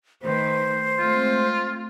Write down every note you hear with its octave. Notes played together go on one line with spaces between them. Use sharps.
D#3 A3 B4 C5
G#3 A3 C4 F4